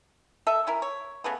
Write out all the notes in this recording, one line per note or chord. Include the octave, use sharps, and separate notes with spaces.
A4 D#5 E5
C#4 E4 A#4
C#5
C#3 A3 B3